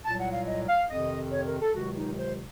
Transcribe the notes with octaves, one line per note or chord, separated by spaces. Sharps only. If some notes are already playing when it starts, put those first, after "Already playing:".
C2 A#2 F#3 A5
F#5
F5
D#5
F5
F2 C3 D#3 D#5
C#5
A#4
A4
C#2 C3 D#3 F#3 F#4
D#4
C5